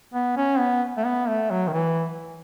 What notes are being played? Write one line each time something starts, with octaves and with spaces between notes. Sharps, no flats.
B3
C#4
B3
A3
B3
A3
F#3
D#3
E3